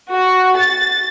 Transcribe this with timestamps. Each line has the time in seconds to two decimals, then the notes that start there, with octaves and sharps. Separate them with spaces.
0.11 F#4
0.56 A6